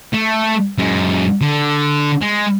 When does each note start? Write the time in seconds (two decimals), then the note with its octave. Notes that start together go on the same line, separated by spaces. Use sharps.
0.13 A3
0.78 F#2 G#3
1.41 D3
2.22 G#3